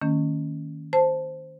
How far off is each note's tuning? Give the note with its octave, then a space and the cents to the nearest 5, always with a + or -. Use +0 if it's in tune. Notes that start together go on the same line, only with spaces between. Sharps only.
D#3 +0 A#3 -40 C#4 +5
C5 +0 A5 +0